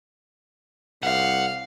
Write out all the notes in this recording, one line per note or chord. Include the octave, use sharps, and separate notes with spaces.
C2 F5 F#5